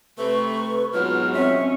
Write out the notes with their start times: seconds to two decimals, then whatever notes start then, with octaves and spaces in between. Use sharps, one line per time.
0.18 C3 A3 B4 C#6
0.93 G#2 B2 F#3 F4 F6
1.33 C4 C#4 E5